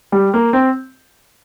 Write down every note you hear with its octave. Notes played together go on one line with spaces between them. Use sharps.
G3
A#3
C4